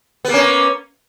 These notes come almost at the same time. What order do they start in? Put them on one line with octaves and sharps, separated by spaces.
B3 A#3 C#4